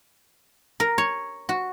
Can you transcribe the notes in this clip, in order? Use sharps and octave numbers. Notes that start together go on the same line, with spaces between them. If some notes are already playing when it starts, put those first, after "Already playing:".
A#4
C#5
F#4